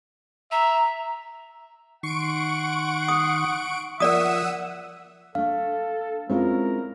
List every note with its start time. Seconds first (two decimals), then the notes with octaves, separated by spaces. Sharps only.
0.52 E5 A#5
2.03 D#3 F#5 C6 C#6 D7
3.08 D#6
4.00 F3 A#4 D5 E5 F#5 D#6 E6 D#7
5.35 A3 D4 A4 F5
6.30 G#3 C4 C#4 E4 F4 A#4